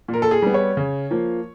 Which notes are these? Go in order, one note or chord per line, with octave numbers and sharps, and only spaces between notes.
A#2
A#4
A4
G#4
G3 B3
C#5
C#3
F3 A#3